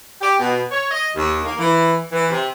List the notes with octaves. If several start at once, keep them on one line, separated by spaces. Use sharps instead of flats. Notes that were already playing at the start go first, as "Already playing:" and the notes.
G4
B2
C#5
D#5
D#2
A#3
E3
E3
C3